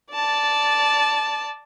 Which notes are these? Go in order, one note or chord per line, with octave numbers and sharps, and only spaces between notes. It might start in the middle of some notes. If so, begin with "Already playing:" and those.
D5 A5